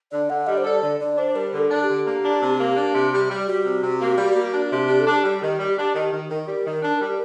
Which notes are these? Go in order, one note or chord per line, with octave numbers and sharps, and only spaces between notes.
D3 D5
D3 F#5
G3 D#5
C5
A4 D5
D3 D5
D3 D5
D4 C5
G3 A#4
D3
A4
D4
G4
D3
A#3
D4
C3
A#3
D4
C3
G3
G3
G3 F#4
C3
C3
A#3
G3
A#3
D4
C3
D4 G4
A4
D4 G4
G3
D#3
G3
D4
D#3
D#3
D#3 A#4
G3
D#3
D4
G3